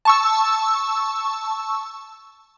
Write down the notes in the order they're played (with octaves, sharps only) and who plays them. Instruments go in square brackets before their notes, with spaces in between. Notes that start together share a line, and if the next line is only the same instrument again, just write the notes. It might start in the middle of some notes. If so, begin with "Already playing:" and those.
[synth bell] A5 C#6 E6